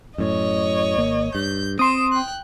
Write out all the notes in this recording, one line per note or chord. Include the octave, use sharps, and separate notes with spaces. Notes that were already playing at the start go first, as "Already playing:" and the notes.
F#2 A2 C#5 D#5
G#1 A#3
G2 G6
C4 C6 D#6 D7 E7
G5 F#6